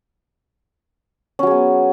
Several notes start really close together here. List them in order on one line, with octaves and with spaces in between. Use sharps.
C#4 F#3 G#4 B3